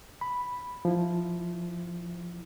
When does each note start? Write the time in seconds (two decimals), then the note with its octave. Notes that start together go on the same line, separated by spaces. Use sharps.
0.21 B5
0.85 F3 E4